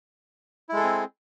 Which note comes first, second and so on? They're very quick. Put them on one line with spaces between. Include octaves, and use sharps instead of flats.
E4 G#3 A4 G#4 C4